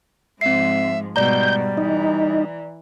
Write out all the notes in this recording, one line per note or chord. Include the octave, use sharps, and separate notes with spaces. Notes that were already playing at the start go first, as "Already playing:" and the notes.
G#2 F3 C4 E5 C7
G#2 B2 G3 D5 A#5 G6
E3 D#4